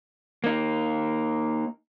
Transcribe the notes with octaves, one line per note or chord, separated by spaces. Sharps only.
A#3 D#4